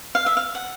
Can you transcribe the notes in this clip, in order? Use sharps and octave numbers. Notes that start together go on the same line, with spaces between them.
F5
E5
F5
F#5